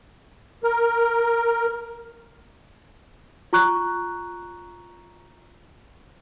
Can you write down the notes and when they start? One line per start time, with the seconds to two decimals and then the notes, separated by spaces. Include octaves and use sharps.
0.64 A#4
3.53 F4 A#5 C#6 F#6